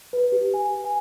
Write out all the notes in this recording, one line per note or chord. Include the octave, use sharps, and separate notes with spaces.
B4
G4
G#5
G#5